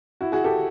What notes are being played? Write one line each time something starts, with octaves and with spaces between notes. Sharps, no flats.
E4 F#4
F#4 G#4
G4 A4